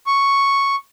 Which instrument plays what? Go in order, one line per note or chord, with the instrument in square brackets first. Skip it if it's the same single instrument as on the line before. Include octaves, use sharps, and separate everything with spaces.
[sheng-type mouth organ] C#6